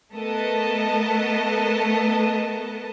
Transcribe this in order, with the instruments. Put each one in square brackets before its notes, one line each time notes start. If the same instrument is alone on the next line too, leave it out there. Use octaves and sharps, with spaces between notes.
[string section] A3 B3 A4 A#4 D#5 A5